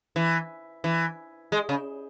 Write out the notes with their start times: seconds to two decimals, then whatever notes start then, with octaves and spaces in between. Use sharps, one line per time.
0.16 E3
0.84 E3
1.52 G#3
1.69 C#3